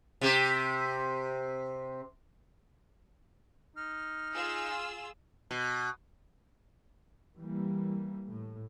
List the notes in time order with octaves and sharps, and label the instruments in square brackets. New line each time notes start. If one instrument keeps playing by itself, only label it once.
[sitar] C3 G4
[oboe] D#4 [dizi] F6
[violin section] F4 G#4 E6
[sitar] B2
[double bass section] E3 G3 A#3
A2